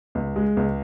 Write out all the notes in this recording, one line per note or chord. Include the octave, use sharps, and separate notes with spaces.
C#2
G#3
C#2